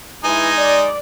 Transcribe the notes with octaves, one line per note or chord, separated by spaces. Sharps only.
E3 G#3 D#4 G#5
D5